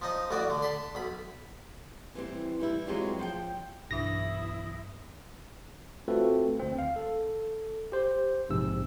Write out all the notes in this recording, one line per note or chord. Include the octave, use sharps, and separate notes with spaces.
F3 D#4 D#5
A1 E3 F#4 D5 D#6
D3
A5 B5 C6
B1 B5
E3 G3 C4
E3 G3 E4
F#3 G#3 C4 F4 G4
F3 F#5 G5
B1 G2 E3 D4 E4 D#6 A#6
A3 C4 F4 F#4 A4 B4
D2 C4
F5
A4
G4 C5
A#1 G#2 C3 E6